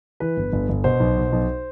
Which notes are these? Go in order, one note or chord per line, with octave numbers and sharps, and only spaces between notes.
E3 B4
G1
G1
G1
B2 C5
B1
B2
B1